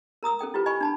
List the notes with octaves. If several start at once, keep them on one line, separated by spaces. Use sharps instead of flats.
A#4 A#5 D#6 E6
C#4 A4 G5 D#6
E4 F4 G4 B4
D#5 G#5 B5 C#6
D4 A5 B5